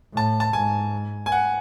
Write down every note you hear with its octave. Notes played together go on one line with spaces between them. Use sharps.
A2 A5
A5
G#2 G#5
G#5
F#5